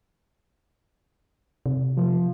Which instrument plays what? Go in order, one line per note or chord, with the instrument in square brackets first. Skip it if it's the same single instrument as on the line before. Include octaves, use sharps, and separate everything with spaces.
[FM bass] C3
[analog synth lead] F3